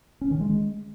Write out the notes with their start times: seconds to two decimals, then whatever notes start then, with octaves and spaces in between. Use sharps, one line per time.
0.21 C#4
0.31 D#3
0.41 G#3